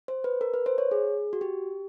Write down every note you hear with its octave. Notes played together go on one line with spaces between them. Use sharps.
C5
B4
A#4
B4
C5
C#5
G#4
F#4
G4